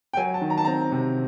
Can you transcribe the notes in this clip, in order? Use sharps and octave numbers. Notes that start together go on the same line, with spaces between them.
G5
F#3 G#5
A5
D#3
A#5
A5
C4 A#5
C3